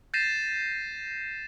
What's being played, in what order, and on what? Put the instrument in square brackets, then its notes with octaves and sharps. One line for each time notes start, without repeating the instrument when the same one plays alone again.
[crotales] G6 A6 A#6 C7 D#7 E7